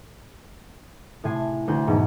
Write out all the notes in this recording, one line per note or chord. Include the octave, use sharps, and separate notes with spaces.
A2 C3 G#5 C7
D2 C5 F#6
E2 G#2 B2